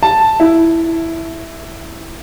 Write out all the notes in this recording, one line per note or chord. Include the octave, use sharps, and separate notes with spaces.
A5
E4